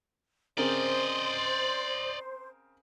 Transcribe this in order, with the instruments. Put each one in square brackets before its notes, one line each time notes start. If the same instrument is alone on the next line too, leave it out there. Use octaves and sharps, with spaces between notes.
[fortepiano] C#3 C4 A#4 [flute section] C5 [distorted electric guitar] D5 D#5